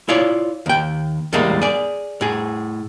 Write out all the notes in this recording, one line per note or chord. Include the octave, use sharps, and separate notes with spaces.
E4 F4 C#5 D5
D#2 G5
E2 A2 G3 G#3 A#3
G#4 D5
A2 G#4